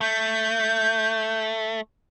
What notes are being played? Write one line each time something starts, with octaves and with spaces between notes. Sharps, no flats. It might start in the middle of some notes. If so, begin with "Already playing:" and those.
A3 G6